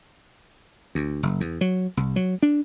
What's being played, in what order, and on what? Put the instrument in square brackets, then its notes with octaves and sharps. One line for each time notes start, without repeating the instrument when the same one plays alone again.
[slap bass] D2
F#1
E2
F#3
C2
F#3
D4